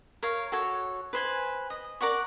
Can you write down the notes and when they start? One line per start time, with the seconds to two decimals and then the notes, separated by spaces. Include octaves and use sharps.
0.23 A#4 C#5 F5
0.52 F#4 A4 C#5
1.13 B4 C5 G#5
1.70 D#5
2.01 A#4 D5 F#5 C#6